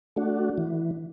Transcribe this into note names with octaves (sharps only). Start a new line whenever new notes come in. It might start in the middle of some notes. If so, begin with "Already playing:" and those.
A3 D4 F#4
E3